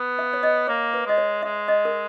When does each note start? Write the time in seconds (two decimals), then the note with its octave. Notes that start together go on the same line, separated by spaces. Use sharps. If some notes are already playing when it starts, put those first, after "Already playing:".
Already playing: B3
0.19 E5
0.33 C#5
0.43 D#5
0.68 A#3 C#5
0.94 B4
1.06 G#3 D#5
1.18 C#5
1.43 G#3 E5
1.68 D#5
1.85 A#4